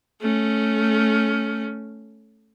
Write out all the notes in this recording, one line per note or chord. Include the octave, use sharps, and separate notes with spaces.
A3 C#4